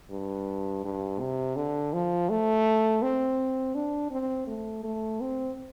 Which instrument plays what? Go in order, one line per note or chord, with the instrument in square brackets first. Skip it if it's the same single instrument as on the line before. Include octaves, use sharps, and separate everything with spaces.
[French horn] G2
G2
C3
D3
F3
A3
C4
D4
C4
A3
A3
C4